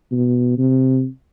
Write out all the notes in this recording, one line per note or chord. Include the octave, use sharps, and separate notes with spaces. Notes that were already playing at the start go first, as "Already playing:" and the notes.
B2
C3